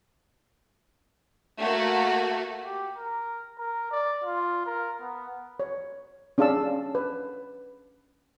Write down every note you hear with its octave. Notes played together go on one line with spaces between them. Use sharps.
A3 A#3 F#4
G4
A#4
A#4
D5
F4
A#4
B3
C#5
C#4 D4 G#4 F5 A5 E6
B4